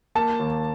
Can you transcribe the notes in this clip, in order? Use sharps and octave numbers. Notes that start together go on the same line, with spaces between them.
A#3 A5
D#2